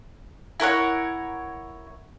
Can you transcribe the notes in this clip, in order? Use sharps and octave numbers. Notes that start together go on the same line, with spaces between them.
E4 A#4 C#5 F#5